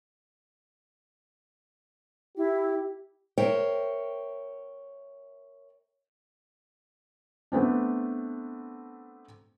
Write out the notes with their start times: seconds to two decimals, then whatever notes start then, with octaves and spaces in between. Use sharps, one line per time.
2.37 E4 G4
3.38 A#4 C5 C#5 E5 G5
7.52 A3 B3 C4 D4